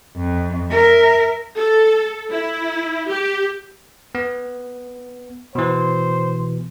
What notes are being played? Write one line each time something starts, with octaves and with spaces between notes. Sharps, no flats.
F2
A#4 E5
A4
E4
G4
B3
B2 E3 C5